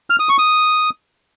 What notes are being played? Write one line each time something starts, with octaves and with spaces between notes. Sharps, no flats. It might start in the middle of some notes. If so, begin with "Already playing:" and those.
F6
D#6
C#6
D#6